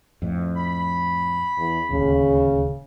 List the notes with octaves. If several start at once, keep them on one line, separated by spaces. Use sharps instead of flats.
F2 A2
B5
E2
D1 D#2 C#3